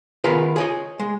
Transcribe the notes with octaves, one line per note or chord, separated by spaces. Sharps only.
D#3 B3 F4 G#4 A#4 B4
G#4 C#5 D#5
G#3